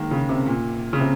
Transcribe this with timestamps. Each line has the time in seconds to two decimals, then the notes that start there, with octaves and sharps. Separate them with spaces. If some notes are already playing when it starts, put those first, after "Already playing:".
Already playing: D#3 G#3 A#3
0.11 C#3
0.29 C3
0.47 A#2
0.93 C#3
1.00 C3